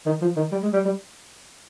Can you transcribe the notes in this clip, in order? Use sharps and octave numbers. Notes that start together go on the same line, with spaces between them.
D#3
F3
D#3
G3
G#3
G3
G3